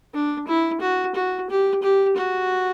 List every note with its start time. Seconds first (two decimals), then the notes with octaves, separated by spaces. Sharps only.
0.14 D4
0.48 E4
0.81 F#4
1.15 F#4
1.50 G4
1.83 G4
2.17 F#4